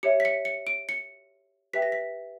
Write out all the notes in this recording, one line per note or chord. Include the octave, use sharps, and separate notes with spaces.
G4 C#5 E5 C#7
B6
C#7
C#7
D7
C#7
G4 B4 E5 G5 B6
A#6
B6